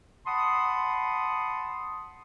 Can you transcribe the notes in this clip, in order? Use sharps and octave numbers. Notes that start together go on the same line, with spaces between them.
F#5 A5 B5 C6 D#6